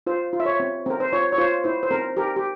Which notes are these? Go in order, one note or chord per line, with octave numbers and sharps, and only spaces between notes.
F4 C5
F4
E5
C#5
C4
C4 A#4
C5
F4 C#5
C#5
F4 C5
E4 C5
C5
C4 A#4
G4 A#4
G4